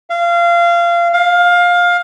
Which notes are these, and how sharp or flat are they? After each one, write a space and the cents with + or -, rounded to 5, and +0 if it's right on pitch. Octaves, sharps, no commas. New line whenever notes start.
F5 -25
F5 +15